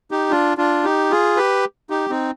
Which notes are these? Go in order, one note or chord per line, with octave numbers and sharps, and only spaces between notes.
D#4 G4
D4 F4
D4 F4
D#4 G4
F4 G#4
G4 B4
D#4 G4
C4 D#4